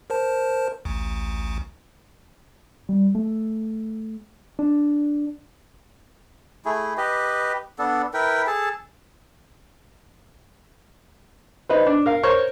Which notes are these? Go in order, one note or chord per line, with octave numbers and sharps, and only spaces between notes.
A#4 C5 A5
A1 D2
G3
A3
D4
A3 E4 G#4
G4 B4 D#5
B3 D4 A4
E4 A#4 B4 G5
G#4 A4 A5
D#4 B4 C5
D4
A#4 F5
A#4 C5 C#5 C#6